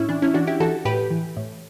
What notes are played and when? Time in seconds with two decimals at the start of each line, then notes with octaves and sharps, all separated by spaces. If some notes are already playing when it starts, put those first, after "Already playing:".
Already playing: A2 C#4 E4
0.09 E3 D4
0.22 C#4 E4
0.34 E3 D4 F#4
0.47 E4 G4
0.60 E3 F#4 A4
0.85 A2 G4 B4
1.11 E3
1.37 A2